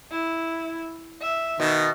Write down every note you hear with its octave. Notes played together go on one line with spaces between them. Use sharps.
E4
E5
B2 D#3